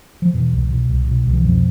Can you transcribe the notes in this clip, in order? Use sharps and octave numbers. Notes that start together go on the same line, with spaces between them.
F3
E2 B2 E3
C2
B2
C2
B2
C2
E3
F2 B2 F3